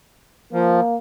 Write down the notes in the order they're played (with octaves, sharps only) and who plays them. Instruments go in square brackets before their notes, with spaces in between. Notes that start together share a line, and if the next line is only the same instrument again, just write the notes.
[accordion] F3 [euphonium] A#3